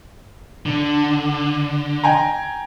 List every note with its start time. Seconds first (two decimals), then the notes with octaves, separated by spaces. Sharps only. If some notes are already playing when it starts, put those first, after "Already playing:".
0.66 D3
2.03 G5 G#5 A#5